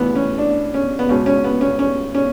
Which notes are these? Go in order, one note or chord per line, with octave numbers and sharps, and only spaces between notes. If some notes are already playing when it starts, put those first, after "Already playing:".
Already playing: D2 C#3 E3 B3
C#4
D4
C#4
B3
C#2 B2 C#4
C#4
B3
C#4
C#4
C#4